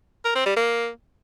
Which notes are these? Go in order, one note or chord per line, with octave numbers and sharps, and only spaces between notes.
A#4
C4
G3
A#3